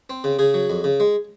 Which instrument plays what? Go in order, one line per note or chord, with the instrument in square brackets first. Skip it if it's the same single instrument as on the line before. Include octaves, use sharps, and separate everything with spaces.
[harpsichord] C4
C#3
C#3 G#4
F#3
F2
C#3
G#3